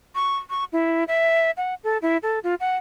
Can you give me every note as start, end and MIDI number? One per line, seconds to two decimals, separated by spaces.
0.15 0.37 85
0.50 0.64 85
0.73 1.04 64
1.08 1.51 76
1.57 1.74 78
1.84 1.98 69
2.02 2.17 64
2.23 2.39 69
2.44 2.55 65
2.60 2.76 78